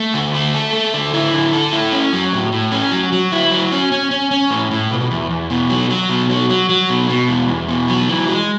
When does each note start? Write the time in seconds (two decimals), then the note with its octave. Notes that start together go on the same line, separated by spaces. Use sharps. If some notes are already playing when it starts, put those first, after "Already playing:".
Already playing: A3
0.14 D3
0.34 A3
0.54 A4
0.73 A3
0.94 D3
1.14 E4
1.33 D3
1.53 A4
1.73 E4
1.93 C#4
2.13 F#3
2.33 A2
2.52 A2
2.71 C#4
2.92 F#3
3.12 F#3
3.32 E4
3.51 F#3
3.72 C#4
3.92 C#4
4.11 C#4
4.31 C#4
4.51 A2
4.71 A2
4.91 B2
5.11 E2
5.31 E2
5.50 B2
5.69 F#3
5.90 F#3
6.10 B2
6.30 F#3
6.50 F#3
6.69 F#3
6.89 B2
7.09 B2
7.28 E2
7.48 E2
7.68 B2
7.88 F#3
8.09 E3
8.28 G#3